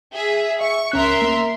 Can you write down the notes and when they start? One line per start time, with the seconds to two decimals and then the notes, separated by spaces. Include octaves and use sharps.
0.13 G#4 E5
0.61 E5 C#6
0.92 C#2 C#4 A#4 E5 C6 F#6
1.22 A#3